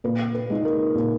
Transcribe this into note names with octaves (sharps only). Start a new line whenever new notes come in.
A#2 B4
B4
G#3 D#4
A#4
A#2